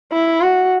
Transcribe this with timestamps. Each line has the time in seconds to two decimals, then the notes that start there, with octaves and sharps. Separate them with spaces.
0.12 E4
0.41 F#4